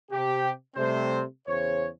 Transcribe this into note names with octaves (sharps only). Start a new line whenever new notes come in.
C3 G4
C3 G3 A3 C4 C5
E2 C#3 C5 C#5